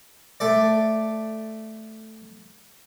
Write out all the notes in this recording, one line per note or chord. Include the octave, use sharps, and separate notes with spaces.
A3 A4 D5